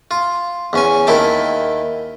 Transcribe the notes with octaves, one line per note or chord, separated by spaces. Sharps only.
F4
E2 C#4 G#5
D#2 D#3 E4 G5 A5